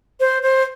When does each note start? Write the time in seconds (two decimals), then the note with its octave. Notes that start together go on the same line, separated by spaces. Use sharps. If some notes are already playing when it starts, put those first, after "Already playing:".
0.19 C5
0.42 C5